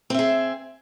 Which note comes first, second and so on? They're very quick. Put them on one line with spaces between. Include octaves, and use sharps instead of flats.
C4 E5 G#4